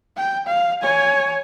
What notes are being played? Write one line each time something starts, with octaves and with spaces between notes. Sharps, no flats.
G5
F5
C#5 G#5